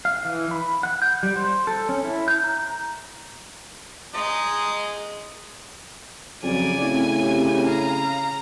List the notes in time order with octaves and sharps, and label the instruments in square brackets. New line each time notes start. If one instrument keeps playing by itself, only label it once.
[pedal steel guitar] F5
E3
B5
F#5
G6
G3
C5
A4
C#4
E4
G6
A#5
[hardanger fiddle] G#3 [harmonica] D#4 D#6
[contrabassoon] F2 [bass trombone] C#3 [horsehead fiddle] F#3 D5 [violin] G#5
[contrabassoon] A2 [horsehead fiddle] C4
[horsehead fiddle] C4 G4
[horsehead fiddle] F5 [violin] A#5